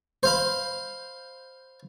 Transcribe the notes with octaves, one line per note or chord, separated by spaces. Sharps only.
C5 F5 B5